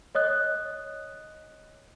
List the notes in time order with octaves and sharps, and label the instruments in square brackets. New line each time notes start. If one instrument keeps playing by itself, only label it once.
[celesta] C#5 D#5 D#6 F#6